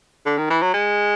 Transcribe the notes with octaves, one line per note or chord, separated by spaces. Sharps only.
D3
D#3
E3
F#3
G#3